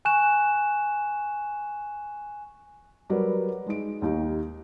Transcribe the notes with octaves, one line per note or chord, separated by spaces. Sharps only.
G#5 C#6 F#6 E7
F#3 G3 A#4 B4 D5
G#3 D#4 D7
D#2 D#4 G4